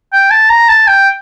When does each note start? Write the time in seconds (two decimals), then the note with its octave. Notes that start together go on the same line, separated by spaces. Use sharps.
0.13 G5
0.31 A5
0.50 A#5
0.69 A5
0.88 G5